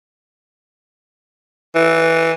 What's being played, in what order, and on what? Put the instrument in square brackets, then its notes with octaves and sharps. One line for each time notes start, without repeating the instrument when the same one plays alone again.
[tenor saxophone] E3